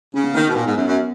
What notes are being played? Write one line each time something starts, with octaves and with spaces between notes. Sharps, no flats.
C#3 C#4
B3
D#3 A#3
B3
B2
A#2 B3
G#2
F#2
F#2